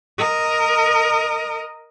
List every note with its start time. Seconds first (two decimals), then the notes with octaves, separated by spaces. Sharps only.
0.18 A#4 D#5